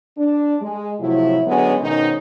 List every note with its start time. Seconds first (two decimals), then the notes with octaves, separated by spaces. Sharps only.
0.18 D4
0.61 G#3
1.00 A2 C3 F3 F#3 E4
1.46 D3 F#3 G#3 B3 C#4
1.81 G#2 B2 D#3 C#4 D#4